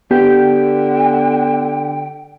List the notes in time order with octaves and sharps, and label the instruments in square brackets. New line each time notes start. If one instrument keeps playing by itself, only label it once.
[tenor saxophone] D3 [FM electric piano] B3 [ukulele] G4 [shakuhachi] G5